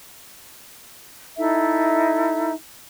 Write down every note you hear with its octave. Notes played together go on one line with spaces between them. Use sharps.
D#4 E4 A4 E5